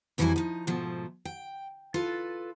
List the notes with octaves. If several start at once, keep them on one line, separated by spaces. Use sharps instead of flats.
F2 E3 F#3 G3 E4 G#5
F3 D#4
G#2 B2 F3 A3
G5
F4 A4 B4